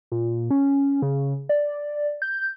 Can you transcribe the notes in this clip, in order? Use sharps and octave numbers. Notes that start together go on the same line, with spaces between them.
A#2
C#4
C#3
D5
G6